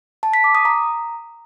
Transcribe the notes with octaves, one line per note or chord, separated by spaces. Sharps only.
A5
B6
D6
D#6
A#5